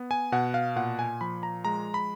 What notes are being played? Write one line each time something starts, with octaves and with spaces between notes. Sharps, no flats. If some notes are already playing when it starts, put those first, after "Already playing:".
Already playing: B3
G#5
B2 F#5
F5
A#2 F#5
G#5
F3 B5
A#5
G#3 A#5
B5